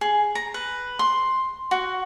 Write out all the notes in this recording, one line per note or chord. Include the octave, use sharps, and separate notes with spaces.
G#4
A#5
B4
C6
F#4